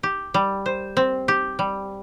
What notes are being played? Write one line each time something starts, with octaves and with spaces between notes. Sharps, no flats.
G4
G3
C5
C4
G4
G3